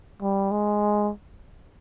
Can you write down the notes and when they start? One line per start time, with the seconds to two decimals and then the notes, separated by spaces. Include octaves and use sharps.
0.22 G3
0.51 G#3